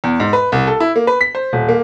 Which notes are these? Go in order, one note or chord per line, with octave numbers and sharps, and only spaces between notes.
E2
G#2
B4
C2
A4
E4
A#3
B4
B6
C5
D#1
A#3